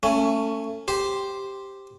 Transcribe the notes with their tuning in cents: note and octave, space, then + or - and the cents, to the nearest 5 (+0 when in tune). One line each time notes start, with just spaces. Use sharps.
A3 +25 C#4 +0
G4 +0 C5 +0